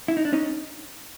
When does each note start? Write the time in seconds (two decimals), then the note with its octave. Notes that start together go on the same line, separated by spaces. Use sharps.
0.08 E4
0.17 D#4
0.25 D4
0.33 C#4 D#4